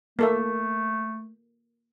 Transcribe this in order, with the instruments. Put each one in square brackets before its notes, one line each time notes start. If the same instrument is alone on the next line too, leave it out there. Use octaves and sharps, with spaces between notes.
[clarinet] A3 [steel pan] A#3 A4 E5